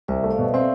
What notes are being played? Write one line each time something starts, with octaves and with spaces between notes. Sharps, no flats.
C2 C5 E5
A3
D5 F5
B2
C4 C5 E5